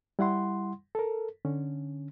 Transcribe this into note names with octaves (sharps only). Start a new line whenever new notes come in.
G3 E4 F#5 C6
A4 A#4
D3 C#4